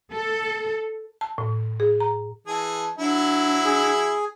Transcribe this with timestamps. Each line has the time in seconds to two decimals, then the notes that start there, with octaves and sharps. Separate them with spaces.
0.12 A4
1.21 A5
1.38 A2
1.80 G#4
2.00 A#5
2.47 E3 G#4 A5
2.98 F#3 D4 E4
3.65 G#4